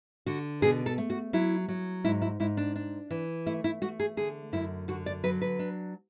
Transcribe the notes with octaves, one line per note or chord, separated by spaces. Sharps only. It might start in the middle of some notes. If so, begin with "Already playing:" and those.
D3 F#4
B2 G#4
A4
A3
F#4
F#3 E4
F#3
G#2 E4
E4
G#2 E4
D4
D4
E3
A3 E4
E4
A3 F#4
G#4
D3 G#4
F#2 E4
D3 F#4
D5
F#3 B4
B4
D4